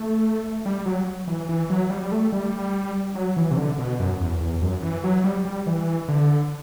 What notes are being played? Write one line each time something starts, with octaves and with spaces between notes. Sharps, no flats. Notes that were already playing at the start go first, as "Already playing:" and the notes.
Already playing: A3
G3
F#3
E3
E3
F#3
G3
G3
A3
G3
F#3
E3
C3
D3
B2
F#2
E2
E2
F#2
E3
F#3
G3
G3
E3
D3